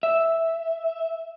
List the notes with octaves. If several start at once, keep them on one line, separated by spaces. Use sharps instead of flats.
E5